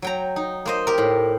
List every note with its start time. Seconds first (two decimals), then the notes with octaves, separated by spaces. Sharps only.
0.02 F#3 G5 A#5
0.36 D#4
0.66 A#3 C5 D#5
0.87 G4 A#4
0.98 A2